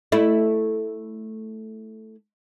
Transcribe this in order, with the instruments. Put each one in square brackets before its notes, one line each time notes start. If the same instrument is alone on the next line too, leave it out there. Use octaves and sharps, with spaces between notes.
[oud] A3 E4